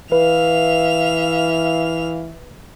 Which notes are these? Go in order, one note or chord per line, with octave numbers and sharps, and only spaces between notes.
E3 B4 E5 F5 F7